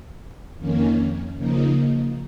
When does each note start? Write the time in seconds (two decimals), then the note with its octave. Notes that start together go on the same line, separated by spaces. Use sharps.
0.58 F2 D#3 A#3 C#4
1.36 C#3 F3 A#3 D#4